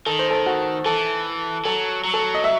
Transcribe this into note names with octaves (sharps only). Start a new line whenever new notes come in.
D#3 A4
C5
A4
F#4
E3 A4
F#3 A4
F#3
A4
D#5
E5